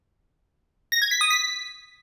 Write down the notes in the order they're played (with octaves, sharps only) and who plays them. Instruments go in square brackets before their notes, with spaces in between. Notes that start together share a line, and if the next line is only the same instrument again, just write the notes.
[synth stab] A#6
G#6
B6
D#6
B6